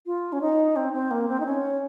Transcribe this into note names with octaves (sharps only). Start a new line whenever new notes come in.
F4
C#4
D#4
C4
C4
A#3
C4
D#4
C#4